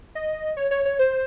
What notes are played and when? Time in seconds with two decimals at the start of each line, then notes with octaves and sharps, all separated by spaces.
0.15 D#5
0.57 C#5
0.71 C#5
0.85 C#5
0.99 C5